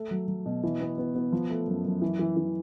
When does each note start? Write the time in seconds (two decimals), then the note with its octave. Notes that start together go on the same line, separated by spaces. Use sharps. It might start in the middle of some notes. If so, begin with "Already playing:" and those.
Already playing: A3
0.11 F#3
0.28 F#3
0.46 B2
0.64 E3
0.81 B3
0.98 B3
1.15 B3
1.32 F3
1.50 A3
1.67 F#2
1.85 F#2
2.02 E3
2.19 E3
2.37 E3